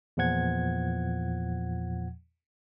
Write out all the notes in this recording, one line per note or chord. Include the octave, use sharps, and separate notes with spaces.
E2 A#2 F3 F#5 G#6